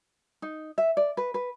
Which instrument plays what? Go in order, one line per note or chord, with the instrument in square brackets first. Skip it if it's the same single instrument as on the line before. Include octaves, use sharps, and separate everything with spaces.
[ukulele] D#4
E5
D5
B4
B4